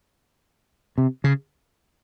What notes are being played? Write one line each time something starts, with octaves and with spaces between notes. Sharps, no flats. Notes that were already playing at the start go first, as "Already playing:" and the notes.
C3
C#3